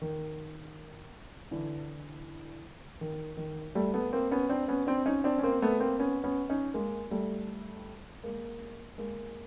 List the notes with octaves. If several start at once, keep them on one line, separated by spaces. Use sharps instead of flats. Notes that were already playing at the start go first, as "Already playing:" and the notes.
D#3
D3 E3
D#3
D#3
G3 A3
A3 B3
A#3 C4
B3 C#4
C4 D4
B3 C#4
C4 D4
C#4 D#4
C4 D4
C#4
A#3 C4
A3 B3
A#3 C4
B3 C#4
B3 C#4
C#4 D#4
G#3 A#3
G3 A3
G#3 A#3
G#3 A#3